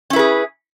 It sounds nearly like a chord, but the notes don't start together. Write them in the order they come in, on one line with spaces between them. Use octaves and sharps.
C#4 E4 B4 G#4